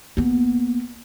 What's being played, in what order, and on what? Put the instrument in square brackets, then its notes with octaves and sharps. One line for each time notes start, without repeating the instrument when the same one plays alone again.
[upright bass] A#3 B3